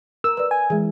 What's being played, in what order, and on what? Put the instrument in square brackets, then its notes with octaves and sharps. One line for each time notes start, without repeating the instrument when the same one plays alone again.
[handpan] A#4 [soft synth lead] E6
[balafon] B4 D5
[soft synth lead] G#5
[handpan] E3 [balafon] G#3 G#4